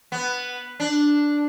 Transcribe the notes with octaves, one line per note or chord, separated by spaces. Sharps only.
B3
D4